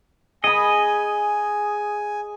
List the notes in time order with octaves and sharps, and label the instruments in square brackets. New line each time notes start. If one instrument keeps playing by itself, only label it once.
[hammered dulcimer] G#4 B5 [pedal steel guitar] D#5 [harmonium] G#5